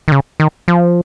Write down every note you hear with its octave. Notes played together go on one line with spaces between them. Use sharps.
D#3
C#3
D#3
F3